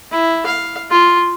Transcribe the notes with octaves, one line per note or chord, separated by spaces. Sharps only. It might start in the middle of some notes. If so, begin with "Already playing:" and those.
E4
F5
F4